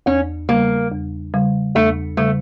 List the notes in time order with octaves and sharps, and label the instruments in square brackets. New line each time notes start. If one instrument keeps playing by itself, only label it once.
[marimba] E2 [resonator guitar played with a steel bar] C#4
[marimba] C#3 G3 [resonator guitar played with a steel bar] A#3
[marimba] E2
C#3 G3
[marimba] E2 [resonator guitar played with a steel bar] A3
[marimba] C#3 G3 [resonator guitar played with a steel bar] A3